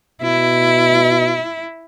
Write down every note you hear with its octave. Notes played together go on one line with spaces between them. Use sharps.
B2 E4